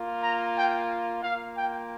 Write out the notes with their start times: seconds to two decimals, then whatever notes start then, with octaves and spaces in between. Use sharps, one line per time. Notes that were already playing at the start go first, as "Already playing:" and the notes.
Already playing: A#3 F4
0.23 A#5
0.56 G5
1.22 A#3 F4 F5
1.56 G5